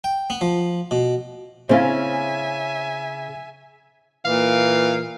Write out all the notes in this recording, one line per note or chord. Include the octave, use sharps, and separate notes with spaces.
G5
B3
F3
B2
C#3 C4 C#4 E4 E5 F5 G#5
A#2 E3 F5